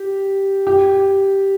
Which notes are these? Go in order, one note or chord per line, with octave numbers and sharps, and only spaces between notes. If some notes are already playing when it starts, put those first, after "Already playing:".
Already playing: G4
G4